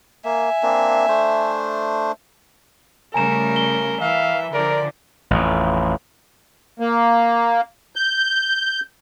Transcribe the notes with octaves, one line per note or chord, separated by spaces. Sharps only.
A#3 E5 G#5
A#3 C4 D4
A3 D4 C5
C#3 G3 A3 A#4 G#5 A#5 E7
G7
E3 E5 F5
D3 F3 A#4 D5
A1 F2
A#3
G6